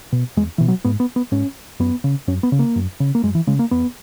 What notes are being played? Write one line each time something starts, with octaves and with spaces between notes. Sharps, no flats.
B2
E2 G#3
B2 E3
F#3
G#2 B3
B3
B3
G#2 C#4
F#2 B3
C#3
F#2 C#4
B3
C#3
A#3
F#2
C#3
A#3
F#2 G#3
E3
C#3 G#3
A#3
E2 B3